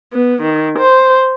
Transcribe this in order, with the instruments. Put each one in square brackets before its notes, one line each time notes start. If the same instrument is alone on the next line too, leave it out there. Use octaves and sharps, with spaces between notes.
[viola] B3
D#3
C5